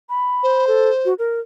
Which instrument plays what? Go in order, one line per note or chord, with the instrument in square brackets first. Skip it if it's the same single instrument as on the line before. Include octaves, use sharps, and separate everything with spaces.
[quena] B5
[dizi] C5
[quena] A4
F#4
A#4